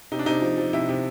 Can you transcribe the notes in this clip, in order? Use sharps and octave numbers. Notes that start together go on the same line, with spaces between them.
C3 D#4
D4
C3 D#4
F3
F3
C3 E4
C3